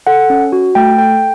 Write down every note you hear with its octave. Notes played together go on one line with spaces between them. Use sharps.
A4 F#5
C#4
F#4
A3 G5
A4 G5